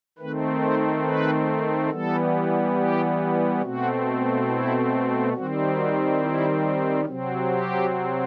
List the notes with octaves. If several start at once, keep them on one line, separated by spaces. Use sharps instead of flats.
D#3 A3 C4 B4
C5
B4
E3 G3 B3 A4
G4
B2 A3 C4 F#4
E4
D#3 G3 C4 F#4
F#4
E4
C3 F#3 C4
G4